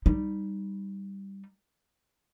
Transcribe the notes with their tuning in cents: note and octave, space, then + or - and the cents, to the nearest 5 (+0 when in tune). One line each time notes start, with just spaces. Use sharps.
G3 +0 D#4 -10